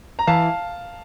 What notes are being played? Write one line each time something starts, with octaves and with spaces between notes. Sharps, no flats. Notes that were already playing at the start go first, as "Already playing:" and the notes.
A#5
E3 F5 A5